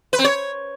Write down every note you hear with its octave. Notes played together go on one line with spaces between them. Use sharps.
B4
C4
C#5